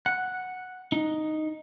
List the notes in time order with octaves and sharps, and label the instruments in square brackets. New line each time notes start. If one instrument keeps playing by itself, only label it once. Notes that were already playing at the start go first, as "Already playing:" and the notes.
[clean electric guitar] F#5
D#4